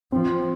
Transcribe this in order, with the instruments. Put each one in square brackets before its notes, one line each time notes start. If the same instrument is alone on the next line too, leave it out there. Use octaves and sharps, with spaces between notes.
[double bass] F3 [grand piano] C4